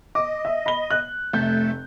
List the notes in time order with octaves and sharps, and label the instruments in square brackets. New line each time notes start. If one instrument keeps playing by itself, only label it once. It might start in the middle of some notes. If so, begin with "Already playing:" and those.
[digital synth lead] D#5 [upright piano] D6
[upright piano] E5
B5 G7
F#6
[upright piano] F1 G6 [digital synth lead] A3